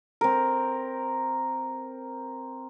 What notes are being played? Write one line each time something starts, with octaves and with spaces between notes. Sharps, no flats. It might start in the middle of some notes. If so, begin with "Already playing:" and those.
C4 A#4